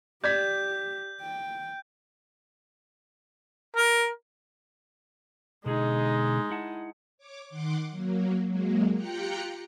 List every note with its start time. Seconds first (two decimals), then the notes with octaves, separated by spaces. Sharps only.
0.24 G4 D5 G6 G#6 B6
1.22 G5
3.76 A#4
5.66 B2 D3 G#3 D#4 G#4
6.50 E4 F#5 A5
7.18 C#5 D6
7.49 D#3 F#5 C6 D6
7.90 F#3 A#3
8.47 F#3 G#3 A#3
8.94 F4 G4 G5 A#5 F#6 C#7